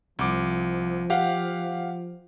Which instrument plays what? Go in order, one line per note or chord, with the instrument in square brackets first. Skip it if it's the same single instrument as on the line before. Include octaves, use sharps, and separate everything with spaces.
[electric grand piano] C2 D6 [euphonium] F3
[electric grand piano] G4 F5 F#5